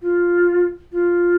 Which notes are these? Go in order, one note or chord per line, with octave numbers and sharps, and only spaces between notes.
F4
F4